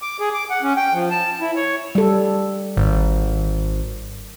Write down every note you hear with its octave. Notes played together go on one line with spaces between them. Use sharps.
D6
G#4
D6
F#5
C#4
G5
F3
A5
E4
C#5
G3 A4
G#1